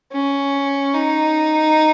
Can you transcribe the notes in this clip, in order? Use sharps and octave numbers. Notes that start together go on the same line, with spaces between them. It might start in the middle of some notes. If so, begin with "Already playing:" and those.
C#4
D#4